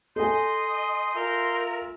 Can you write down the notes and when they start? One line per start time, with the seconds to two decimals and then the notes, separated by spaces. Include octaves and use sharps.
0.16 A4 D#5 G#5 C6 G6
1.14 F4 A#4 E5